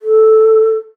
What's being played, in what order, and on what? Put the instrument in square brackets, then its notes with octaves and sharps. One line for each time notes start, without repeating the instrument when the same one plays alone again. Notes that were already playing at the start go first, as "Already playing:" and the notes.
[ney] A4